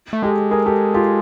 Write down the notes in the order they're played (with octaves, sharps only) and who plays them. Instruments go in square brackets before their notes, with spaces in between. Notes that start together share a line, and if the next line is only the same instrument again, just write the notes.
[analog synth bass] A3
[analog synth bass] G#3 [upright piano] G4 A4
[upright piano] G#4 A#4
G4 A4
F4 G4